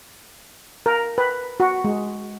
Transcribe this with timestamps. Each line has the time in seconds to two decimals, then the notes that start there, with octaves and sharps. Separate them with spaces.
0.86 A#4
1.18 B4
1.60 F#4
1.84 G#3